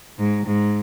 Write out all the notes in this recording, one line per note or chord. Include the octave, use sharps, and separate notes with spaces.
G#2
G#2